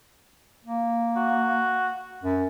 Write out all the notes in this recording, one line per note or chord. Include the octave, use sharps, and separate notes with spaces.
A#3
F#4
F#2